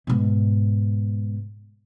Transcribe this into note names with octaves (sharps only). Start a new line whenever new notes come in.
G#2 B2